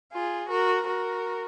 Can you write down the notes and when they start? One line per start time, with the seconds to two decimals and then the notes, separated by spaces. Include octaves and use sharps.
0.13 F4 G#4
0.50 F#4 A#4
0.87 F#4 A#4